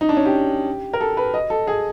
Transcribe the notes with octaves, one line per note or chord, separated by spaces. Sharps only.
D#4
D4
C#4
G4
A#4
A4
B4
D#5
A4
G#4